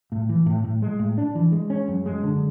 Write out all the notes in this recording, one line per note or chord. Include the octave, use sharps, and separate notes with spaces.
A2
E3
A2
A2
G#3
A2
D4
E3
G#3
C#4
F#2
G#3
D3